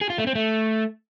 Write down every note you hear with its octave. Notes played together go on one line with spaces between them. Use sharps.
G#4
F4
A3
C4
A3